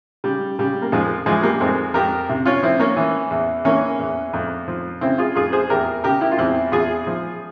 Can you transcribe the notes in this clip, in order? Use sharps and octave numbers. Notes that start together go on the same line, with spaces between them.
C#3 G3
C#3 G3
A#3
F2 F3 G#3
E3 F3 G#3
G3 A#3
F2 G#3 C4
F2 G4 A#4
C3
C#4 F4
F3 C4 E4
A#3 C#4
E3
E2
E3 A#3 C#4
E2
F2
F3
C#3 C4 E4
F4 G#4
F2 F4 G#4
G#4 C5
E2 G4 A#4
C#3 G4 A#4
E4 G4
F4
E2 C4 E4
E2 F4 G#4
F3